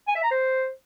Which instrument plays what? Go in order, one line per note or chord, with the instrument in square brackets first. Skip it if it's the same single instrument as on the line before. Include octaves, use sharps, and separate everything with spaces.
[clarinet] G#5
E5
A#5
C5